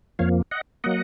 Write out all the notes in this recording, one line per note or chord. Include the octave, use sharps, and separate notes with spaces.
F2 F3 A#3 C#5 F5
D#5 F#5
F#3 A#3 D#5 F#5